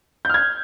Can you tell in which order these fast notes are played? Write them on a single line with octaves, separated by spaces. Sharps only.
G6 F6 G#6